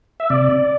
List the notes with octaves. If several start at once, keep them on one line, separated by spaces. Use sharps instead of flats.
E5
C3 D5